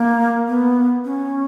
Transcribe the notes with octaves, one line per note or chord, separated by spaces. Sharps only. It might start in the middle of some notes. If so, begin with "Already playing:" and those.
Already playing: A#3
B3
C#4